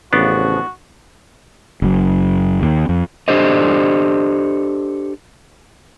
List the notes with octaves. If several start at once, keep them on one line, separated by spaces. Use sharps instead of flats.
A1 C#3 F3 B3 D4 F#4
F#1 F#2
D#2
F2
D4 G4 A4 C5 D5 D#5